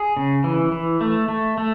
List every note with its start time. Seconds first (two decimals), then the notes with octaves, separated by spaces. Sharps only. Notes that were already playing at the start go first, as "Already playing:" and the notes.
Already playing: G#4
0.17 C#3
0.44 E3
0.72 E3
1.01 A3
1.29 A3
1.58 A3